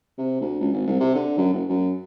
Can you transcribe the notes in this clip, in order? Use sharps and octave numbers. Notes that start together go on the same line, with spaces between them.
C3
D2
C#2
G#1
C2
C3
D3
F#2
F#1
F#2